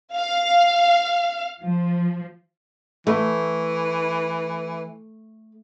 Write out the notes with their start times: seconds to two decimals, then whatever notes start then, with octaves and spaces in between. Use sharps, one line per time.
0.15 F5
1.62 F3
3.07 E3 A3